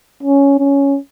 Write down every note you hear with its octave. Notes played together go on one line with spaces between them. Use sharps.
C#4
C#4